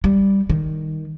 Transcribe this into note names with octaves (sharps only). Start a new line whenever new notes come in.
G3
D#3